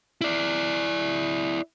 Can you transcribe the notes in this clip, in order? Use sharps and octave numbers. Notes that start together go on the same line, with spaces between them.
E4 D5